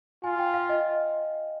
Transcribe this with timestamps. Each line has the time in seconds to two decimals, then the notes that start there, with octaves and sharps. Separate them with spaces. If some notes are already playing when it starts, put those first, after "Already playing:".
0.23 F4 G#5
0.39 G5
0.54 F5
0.69 D#5